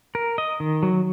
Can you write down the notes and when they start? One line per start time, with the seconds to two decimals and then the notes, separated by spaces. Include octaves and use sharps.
0.15 A#4
0.38 D#5
0.60 D#3
0.83 F#3